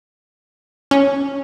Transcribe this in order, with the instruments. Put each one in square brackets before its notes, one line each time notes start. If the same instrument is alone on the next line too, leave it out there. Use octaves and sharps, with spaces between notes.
[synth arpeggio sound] C#4